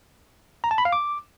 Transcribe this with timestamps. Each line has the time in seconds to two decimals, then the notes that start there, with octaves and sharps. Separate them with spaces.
0.64 A#5
0.71 A5
0.78 B5
0.85 F5
0.92 D6